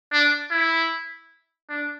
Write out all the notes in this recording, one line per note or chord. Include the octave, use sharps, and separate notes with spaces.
D4
E4
D4